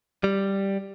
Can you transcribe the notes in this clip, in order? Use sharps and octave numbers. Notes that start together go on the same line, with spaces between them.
G3